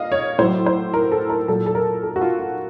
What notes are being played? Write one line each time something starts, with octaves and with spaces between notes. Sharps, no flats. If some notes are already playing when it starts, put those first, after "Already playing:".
Already playing: A#2 D#5 F5
C#5
A2 F#3 C5
C5
A#4
A4
A#4
A#2 F#3 A4
A4
A#4
A4
F#4
F4
F4